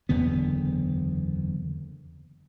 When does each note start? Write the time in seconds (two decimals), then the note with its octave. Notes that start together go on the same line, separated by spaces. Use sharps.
0.09 F#1 E2 D3 B3